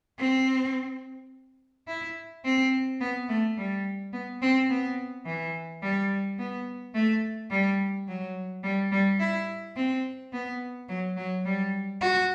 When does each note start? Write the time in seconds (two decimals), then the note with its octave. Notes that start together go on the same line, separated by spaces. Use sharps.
0.19 C4
1.87 E4
2.45 C4
3.01 B3
3.29 A3
3.57 G3
4.13 B3
4.42 C4
4.69 B3
5.26 E3
5.82 G3
6.38 B3
6.94 A3
7.51 G3
8.08 F#3
8.63 G3
8.92 G3
9.20 E4
9.76 C4
10.33 B3
10.89 F#3
11.17 F#3
11.45 G3
12.01 F#4